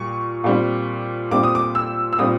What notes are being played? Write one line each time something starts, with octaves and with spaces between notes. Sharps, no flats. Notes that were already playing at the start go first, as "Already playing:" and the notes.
Already playing: A#2 G3 C#6
A#2 G3 C4
A#2 G3 C4 D6
D#6
D6
E6
E6
A#2 G3 C4 D#6